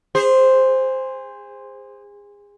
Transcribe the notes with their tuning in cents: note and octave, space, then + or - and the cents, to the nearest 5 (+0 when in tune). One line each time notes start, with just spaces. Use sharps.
G#4 -30 C5 +0